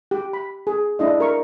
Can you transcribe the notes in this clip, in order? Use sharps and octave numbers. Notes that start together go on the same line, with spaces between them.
G4
B5
G#4
D4 E4 D#5
A#4 C#6